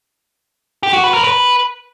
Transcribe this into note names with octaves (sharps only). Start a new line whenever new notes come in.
G4
F#4
B4
A#4
B4